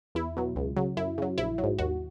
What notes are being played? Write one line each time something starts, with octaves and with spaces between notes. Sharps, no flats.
E2 E4
B2 F#3
C#2
C#3 F#3
F#2 E4
C#3 F#3
A#1 E4
F#3
G#2
D#2 F#4